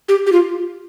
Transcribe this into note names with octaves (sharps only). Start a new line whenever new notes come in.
G4
G4
F4